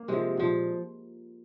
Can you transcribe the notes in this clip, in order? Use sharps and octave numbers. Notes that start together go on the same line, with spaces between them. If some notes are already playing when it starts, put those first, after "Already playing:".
Already playing: A#3
C3 F3 G#3
A#2 F3